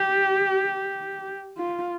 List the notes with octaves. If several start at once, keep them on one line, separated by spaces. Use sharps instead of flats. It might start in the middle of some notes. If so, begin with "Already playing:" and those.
Already playing: G4
F4